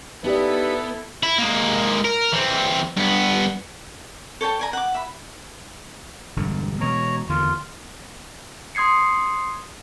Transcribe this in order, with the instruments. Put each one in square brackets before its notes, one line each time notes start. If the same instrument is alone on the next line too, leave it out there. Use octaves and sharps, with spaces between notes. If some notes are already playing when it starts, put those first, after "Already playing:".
[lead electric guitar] B3 [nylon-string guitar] D#4 G4 D5 [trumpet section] E4 A4 [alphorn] B4
[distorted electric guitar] E4
G#3 A#3
A#4
E3 C4
G2 B3
[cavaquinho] A4 C#5 G5 A5
D5 G#5 A#5
F#5 D6
E5 B5
[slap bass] E1 G2 D3
[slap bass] B2 E3 G#3 [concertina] C#5 A#5
[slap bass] E2 D3 D#3 [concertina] F4
[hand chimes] C6 D#6 G#6 C7 C#7